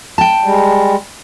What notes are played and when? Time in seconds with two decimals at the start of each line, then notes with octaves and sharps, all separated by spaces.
0.18 G5 A5
0.42 G3 G#3